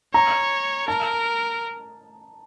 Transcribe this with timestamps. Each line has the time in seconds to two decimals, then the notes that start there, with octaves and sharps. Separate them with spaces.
0.13 C#5 A#5
0.88 A#4 A5